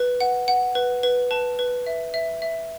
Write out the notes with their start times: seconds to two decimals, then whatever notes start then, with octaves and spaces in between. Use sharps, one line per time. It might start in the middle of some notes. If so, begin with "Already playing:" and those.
Already playing: B4
0.21 F#5
0.48 F#5
0.75 B4
1.03 B4
1.31 B4 A5
1.59 B4
1.87 E5
2.14 E5
2.42 E5